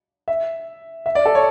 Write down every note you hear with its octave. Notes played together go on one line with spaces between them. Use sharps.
E5
E5
D5
A4
C#5